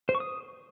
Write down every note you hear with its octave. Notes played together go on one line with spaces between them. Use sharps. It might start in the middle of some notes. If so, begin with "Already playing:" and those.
C5
C#6
D#6